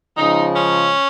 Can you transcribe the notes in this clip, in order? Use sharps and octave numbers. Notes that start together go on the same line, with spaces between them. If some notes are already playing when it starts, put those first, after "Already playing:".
C#3 F3 G#3 D#4
C#4